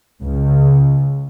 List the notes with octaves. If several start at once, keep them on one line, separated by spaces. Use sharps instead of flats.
C#2